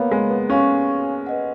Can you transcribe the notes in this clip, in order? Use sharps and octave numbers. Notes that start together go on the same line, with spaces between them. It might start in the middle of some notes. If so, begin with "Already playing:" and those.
Already playing: A#3 B3 C#5 F5 B5
G#3
B3
C#4 C#5 F5 G#5 C#6
B4 D#5 F#5